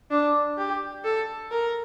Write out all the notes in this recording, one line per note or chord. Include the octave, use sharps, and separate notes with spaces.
D4
G4
A4
A#4